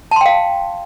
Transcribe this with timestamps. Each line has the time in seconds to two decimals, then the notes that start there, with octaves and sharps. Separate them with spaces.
0.11 A5
0.16 C6
0.21 G5
0.26 F5